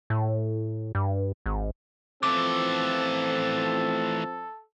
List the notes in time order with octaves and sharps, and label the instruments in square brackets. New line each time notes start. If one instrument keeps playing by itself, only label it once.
[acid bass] A2
G2
G#1
[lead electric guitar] E3 A3 [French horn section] F3 C4 [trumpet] A4 [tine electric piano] D6